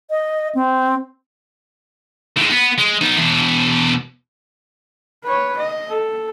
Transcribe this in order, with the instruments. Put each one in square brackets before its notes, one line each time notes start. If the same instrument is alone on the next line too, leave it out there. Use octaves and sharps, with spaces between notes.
[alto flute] D#5
C4
[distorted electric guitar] A2 G#3
B3
G#3
B3 D#4
E2 B2
[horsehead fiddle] B4 C#5
D#5
A4